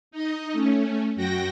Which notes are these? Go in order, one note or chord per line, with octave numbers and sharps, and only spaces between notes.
D#4 D#5
A3 C#4
F#2 F#4 G5 A#6